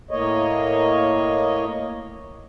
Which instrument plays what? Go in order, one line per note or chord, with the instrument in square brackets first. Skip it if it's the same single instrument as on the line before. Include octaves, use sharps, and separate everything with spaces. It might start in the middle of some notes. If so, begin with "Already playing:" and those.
[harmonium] A2 A#3 C#5 D#5